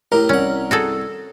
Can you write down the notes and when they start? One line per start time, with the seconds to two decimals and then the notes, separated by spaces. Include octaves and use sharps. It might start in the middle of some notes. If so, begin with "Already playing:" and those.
0.12 A2 G4 A#4
0.29 C2 C#4 F#5
0.71 F#4 G#4 A4